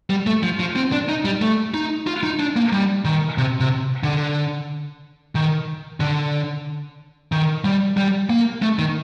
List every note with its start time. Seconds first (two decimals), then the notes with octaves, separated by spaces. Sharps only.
0.10 G3
0.27 A3
0.43 F3
0.60 F3
0.76 C4
0.92 D4
1.09 D#4
1.25 G3
1.42 A3
1.74 D#4
2.07 F4
2.24 D#4
2.40 D4
2.56 A#3
2.73 G3
3.05 D#3
3.38 C3
3.60 C3
4.03 D3
5.35 D#3
6.00 D3
7.32 D#3
7.64 G3
7.97 G3
8.30 A#3
8.62 A3
8.79 D#3